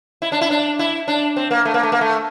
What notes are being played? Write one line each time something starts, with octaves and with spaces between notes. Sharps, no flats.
E4
D4
E4
D4
E4
D4
C4
A#3
A3
A#3
A3
A#3
A3